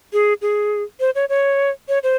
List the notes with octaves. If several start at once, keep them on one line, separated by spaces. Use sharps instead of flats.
G#4
G#4
C5
C#5
C#5
C#5
C5